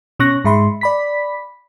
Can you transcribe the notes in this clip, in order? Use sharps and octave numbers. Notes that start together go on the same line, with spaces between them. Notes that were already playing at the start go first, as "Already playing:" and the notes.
B2 C#4 C#6 F#6 A#6
G#2 G#3 E5 B5 C6
D5 B5 B6